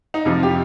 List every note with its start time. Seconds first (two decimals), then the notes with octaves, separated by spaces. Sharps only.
0.14 D#4
0.25 F2 C3 F3 F4
0.43 G4